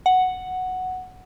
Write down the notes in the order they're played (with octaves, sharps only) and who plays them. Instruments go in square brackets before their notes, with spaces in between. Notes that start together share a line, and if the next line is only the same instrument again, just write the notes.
[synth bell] F#5